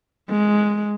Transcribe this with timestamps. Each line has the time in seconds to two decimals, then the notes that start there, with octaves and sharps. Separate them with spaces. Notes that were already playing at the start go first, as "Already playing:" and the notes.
0.30 G#3